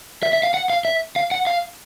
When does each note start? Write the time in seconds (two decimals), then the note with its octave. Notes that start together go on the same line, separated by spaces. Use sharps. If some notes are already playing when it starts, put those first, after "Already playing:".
0.23 E5
0.33 E5
0.43 F5
0.54 F#5
0.70 F5
0.85 E5
1.16 F5
1.31 F#5
1.47 F5